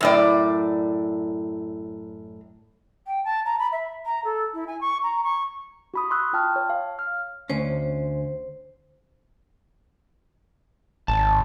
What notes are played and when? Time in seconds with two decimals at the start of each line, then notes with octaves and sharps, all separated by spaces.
0.01 F#2 A2 D5
3.07 G5
3.25 A5
3.46 A#5
3.59 B5
3.72 E5
4.06 A#5
4.24 A4
4.54 E4
4.67 G#5
4.81 C#6
5.03 A#5
5.24 C#6
5.94 F#4 B5 D#6
6.10 C6 C#6 D#6 E6 F#6
6.33 F4 G5 A5 F6
6.56 C#5
6.70 F5
6.99 F6
7.50 D2 C#4 C5
11.08 G#1 A5